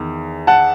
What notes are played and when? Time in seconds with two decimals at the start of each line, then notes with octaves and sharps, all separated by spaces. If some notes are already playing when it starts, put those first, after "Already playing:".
Already playing: E2 D#3
0.47 F#5 A5